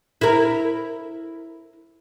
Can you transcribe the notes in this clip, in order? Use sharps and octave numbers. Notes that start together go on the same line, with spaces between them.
E4 A#4